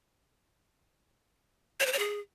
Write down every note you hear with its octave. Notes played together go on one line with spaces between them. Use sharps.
C#5
C5
C#5
G#4